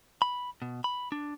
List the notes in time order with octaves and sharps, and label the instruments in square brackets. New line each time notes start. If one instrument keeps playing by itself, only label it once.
[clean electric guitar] B5
B2
B5
D4